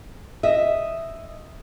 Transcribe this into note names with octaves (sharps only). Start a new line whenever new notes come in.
D#5 E5